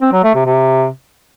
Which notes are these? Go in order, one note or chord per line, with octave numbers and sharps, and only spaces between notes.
C4
F#3
A3
C3
C3